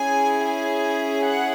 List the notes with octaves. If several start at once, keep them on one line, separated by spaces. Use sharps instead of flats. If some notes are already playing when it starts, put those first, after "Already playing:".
Already playing: C#4 E4 G#4 G#5
G#5
F#5